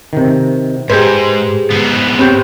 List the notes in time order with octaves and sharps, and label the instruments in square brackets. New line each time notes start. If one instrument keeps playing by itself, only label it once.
[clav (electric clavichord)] C3 D#3
[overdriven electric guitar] G#2 [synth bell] G4 G#4 B4 [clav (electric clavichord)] C5
[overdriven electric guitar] G#2 B3
[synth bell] C4 G4 [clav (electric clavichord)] B4 C#5 G5